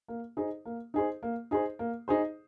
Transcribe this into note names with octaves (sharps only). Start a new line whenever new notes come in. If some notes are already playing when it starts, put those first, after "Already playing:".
A#3
D#4 G#4 C5
A#3
D#4 G#4 C5
A#3
D#4 G#4 C5
A#3
D#4 G#4 C5